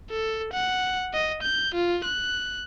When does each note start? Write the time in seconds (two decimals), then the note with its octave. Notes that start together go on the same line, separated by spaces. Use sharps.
0.10 A4
0.53 F#5
1.14 D#5
1.42 G6
1.74 F4
2.04 F#6